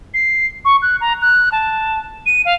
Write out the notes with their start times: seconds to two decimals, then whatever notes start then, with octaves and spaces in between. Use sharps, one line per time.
0.14 C7
0.65 C#6
0.82 F#6
1.01 A#5
1.21 F#6
1.52 A5
2.26 D#7
2.45 F5